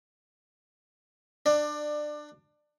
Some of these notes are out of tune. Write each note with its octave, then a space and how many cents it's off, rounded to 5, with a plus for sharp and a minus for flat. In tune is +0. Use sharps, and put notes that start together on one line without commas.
D4 +25 D5 +20